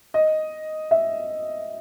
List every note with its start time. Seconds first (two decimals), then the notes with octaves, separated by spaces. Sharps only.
0.14 D#5
0.91 E5